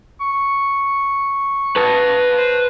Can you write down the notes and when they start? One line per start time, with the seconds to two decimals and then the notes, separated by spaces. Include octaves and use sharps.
0.21 C#6
1.76 B4 A5
2.38 C5